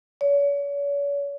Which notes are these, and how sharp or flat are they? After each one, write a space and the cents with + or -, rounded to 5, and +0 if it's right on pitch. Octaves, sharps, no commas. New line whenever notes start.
C#5 +40